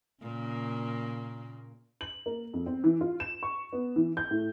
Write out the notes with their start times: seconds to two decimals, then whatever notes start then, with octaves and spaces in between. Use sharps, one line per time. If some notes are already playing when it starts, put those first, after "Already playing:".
0.21 A#2 C#3 A#3
2.01 F#7
2.26 A#3
2.54 F2
2.66 C4
2.84 E3
3.01 F4
3.20 E7
3.43 C#6
3.73 B3
3.96 E3
4.17 G6
4.31 A2